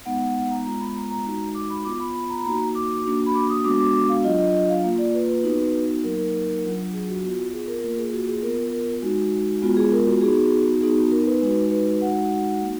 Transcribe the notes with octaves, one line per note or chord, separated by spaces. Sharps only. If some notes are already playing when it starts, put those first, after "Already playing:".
G#3 B3 D#4 F#5
F#5
F#5
A#5
G#3 B3 F4 A#5
B5
A#5
A#5
G#3 D#4 F#4 A#5
D6
B5
B3 F4 D6
B5
B5
A#5
B5
A#3 D#4 F#4 A#5
D6
A#3 D4 F#4
B5
D6
D#6
G#3 B3 D4 F#4 D6
D6
D6
F5
F#3 D4 F4 D#5
D#5
D#5
F5
A#3 F4
D5
B4
B4
B3 D#4 F#4
F#3 A#3 D#4 A#4
A#4
F#3 D4 F4
G#4
F#4
B3 F4 F#4
G#4
A#4
A#3 F4 A#4
G#4
F#4
G#4
B3 F4 A#4
A#4
G#3 D#4 F#4
G#3 B3 F4 F#4
G#4
A#4
F#4
B3 D#4 F#4 G#4
B3 D#4 F#4 G#4
F#4
A#4
B4
G#3 D#4 F#4 B4
B4
B4
G#3 D#4 F#4 F#5
A#3 D#4 F#4